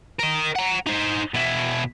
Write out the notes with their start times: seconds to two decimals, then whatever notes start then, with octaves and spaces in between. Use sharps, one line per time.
0.19 A#4 D#5
0.55 F#5 A#5
0.87 D#4 C5
1.34 B2 E4